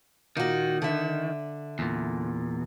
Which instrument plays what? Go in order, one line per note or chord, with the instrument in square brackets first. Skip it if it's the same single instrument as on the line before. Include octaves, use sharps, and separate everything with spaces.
[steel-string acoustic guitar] A#2 F#4 [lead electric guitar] D#3
[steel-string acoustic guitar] D3 E5
[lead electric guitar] E2 A#2